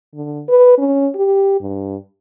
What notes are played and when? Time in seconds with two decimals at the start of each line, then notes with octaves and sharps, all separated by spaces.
0.14 D3
0.49 B4
0.78 C#4
1.15 G4
1.61 G2